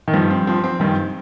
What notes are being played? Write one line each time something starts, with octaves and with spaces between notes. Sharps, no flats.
D#3
G2 F3
C4
F3 C4
C4
G2 D#3